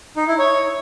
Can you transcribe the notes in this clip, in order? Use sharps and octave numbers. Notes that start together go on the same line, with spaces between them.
D#4
E4
C#5